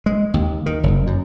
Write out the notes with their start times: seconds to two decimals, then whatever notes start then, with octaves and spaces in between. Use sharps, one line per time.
0.06 G#3
0.34 D#2
0.66 D#3
0.83 F#1
1.07 F#2